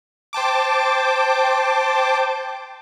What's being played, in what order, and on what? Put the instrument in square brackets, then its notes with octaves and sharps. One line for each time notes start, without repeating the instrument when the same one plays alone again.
[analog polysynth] C5 G5 A5 D6